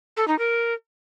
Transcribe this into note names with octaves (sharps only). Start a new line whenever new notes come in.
A4
D#4
A#4